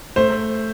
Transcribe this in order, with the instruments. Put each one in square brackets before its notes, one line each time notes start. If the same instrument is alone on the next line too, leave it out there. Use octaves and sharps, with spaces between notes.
[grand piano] A3 [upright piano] C5